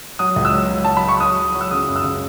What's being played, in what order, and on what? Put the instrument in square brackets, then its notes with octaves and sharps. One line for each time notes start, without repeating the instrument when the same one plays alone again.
[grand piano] F#3 D#6
C#2
E6
F#3
F#3
F#3 A5
B5
F#3 C#6
F#3 D#6
F#3
F#3
E6
C#3 D#6
F#2
E6
C#3